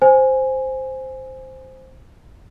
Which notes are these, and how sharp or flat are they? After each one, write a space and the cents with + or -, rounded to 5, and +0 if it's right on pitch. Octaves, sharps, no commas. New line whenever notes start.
C5 +0 G#5 +0